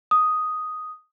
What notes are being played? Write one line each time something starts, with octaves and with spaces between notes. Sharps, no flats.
D#6